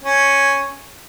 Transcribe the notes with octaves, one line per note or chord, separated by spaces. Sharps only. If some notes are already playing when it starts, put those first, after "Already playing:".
C#4